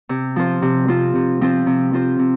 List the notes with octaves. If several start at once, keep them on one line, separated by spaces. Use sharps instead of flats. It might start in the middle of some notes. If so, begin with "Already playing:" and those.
C3
F3 C4 F4 C5
C3
F3 C4 F4 C5
C3
F3 C4 F4 C5
C3
F3 C4 F4 C5
C3